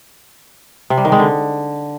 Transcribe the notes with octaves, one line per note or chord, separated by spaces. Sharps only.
C3
G3
D#3
G#3
D3